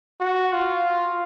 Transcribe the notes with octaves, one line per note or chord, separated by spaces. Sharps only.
F#4
F4